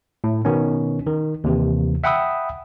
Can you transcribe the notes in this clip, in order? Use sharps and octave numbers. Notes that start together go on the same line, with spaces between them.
A2
B2 D#3 B3 C#4
D#3
D#2 C3 E3
E5 F#5 G5 B5 D#6 E6